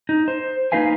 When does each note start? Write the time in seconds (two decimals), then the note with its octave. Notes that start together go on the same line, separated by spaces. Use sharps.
0.09 D#4
0.28 C5
0.72 A#3 D#4 F4 B4 F5 G#5